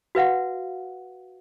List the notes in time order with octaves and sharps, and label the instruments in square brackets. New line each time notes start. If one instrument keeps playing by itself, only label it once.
[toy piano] F#4 B4 F5 F#5